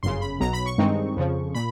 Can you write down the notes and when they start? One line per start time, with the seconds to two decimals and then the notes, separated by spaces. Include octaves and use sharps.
0.03 G1 F#2 C#3 C6
0.21 B5
0.40 B1 B2 F#3 A#5
0.53 B5
0.66 C#6
0.78 G2 D#3 G#3 C4 D#4
1.16 F2 C#3 F3
1.55 A#2 B5